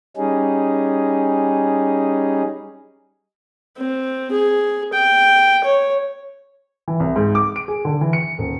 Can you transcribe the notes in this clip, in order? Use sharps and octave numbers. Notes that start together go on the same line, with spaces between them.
G3 C#4 D#4 G#4
C4
G#4
G5
C#5
E3
C2
G#2
D6
D7
G#4
D3
E3
C#7
D#1